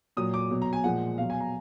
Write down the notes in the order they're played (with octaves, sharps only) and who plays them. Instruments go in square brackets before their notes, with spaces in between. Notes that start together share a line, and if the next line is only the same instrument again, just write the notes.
[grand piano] A#2 F#3 D#6
D6
B2 F#3
A#5
G#5
A#2 F3 G#3 F#5
B2 F#3 F5
G#5
A#5